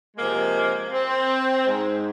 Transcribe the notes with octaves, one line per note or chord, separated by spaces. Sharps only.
C3 F3 G#3 A#3
C4
G#2 G#3